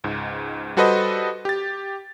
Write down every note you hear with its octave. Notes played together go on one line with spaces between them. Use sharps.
C#2 G#2
G3 F#4 A4 B4 C5 D#5
G4 A6